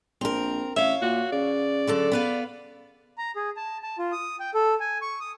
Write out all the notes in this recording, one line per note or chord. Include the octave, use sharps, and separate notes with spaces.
A#1 C4 A#4
A1 C#5 E5 F5
A#2 F#4
C#3 D5
D3 F#3 A4
B3 B4 F5
A#5
G#4
A5
A5
F4
D#6
G5
A4
G#5
C#6
D#6